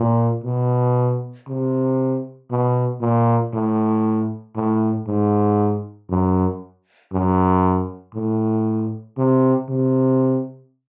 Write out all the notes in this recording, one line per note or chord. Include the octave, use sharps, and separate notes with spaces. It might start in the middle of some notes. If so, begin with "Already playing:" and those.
Already playing: A#2
B2
C3
B2
A#2
A2
A2
G#2
F#2
F#2
A2
C3
C3